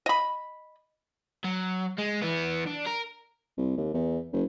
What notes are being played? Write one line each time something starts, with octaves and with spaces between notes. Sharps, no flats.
D#5 B5
F#3
G#3
E3 B3
D4
A#4
C2
D#2
E2
F#1